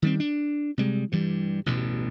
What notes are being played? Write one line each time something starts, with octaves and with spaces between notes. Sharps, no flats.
D#3 G3 C4
D4
C3 G3 G#3
G2 E3 G3
A1 D2 G2 B2